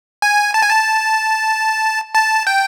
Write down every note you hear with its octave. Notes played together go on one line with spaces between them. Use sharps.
G#5
A5
G#5
A5
A5
G5